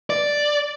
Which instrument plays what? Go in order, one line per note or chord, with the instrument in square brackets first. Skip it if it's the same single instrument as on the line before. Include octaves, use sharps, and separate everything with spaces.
[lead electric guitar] D5